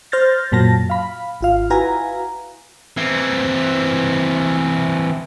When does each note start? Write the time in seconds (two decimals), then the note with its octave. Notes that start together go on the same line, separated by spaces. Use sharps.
0.12 C5 F6 G6 A6 A#6
0.52 F#2 A#2 F#3 A5 A#6
0.90 F5 B5
1.41 G#1 F4 F5
1.70 E4 F#4 B4 F5 G#5 A#5
2.97 E3 C4